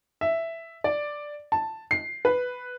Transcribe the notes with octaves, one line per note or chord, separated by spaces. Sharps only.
E5
D5
A5
C7
B4